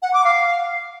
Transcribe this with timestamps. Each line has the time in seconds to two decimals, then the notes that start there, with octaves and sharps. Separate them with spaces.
0.02 F#5
0.13 D6
0.24 F5